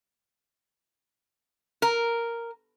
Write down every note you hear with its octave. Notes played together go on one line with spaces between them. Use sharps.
A#4